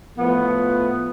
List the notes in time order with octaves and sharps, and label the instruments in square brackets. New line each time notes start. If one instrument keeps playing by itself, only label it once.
[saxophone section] A2 F3 B3